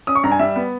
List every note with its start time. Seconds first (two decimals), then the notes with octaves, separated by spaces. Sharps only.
0.07 C#4 D#6
0.15 C#6
0.24 G2 A#5
0.32 G#5
0.39 G3 E5
0.56 B3